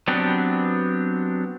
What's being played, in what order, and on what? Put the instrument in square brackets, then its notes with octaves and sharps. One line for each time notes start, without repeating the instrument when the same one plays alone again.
[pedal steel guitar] F#3 B3 C4 D4 G4